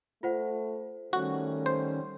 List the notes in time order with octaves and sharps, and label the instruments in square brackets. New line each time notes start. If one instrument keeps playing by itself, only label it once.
[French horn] A3 [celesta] F4 C5 F#5
[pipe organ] D#3 G3 C#4 [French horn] A3 [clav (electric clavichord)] F#4
[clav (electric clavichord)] C5